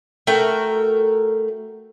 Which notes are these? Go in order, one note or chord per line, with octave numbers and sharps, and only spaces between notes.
A3 F#4 A#4 G5